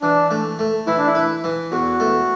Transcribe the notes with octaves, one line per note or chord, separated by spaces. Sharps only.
E3 D4
A3
A3
E3 E4
D4
E4
B4
E3
E2 F#4
A3